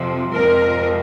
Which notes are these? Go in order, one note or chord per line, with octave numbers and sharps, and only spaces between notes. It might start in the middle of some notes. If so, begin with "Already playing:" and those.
Already playing: F2 C3 F3
F2 C3 F3 G#3 A#4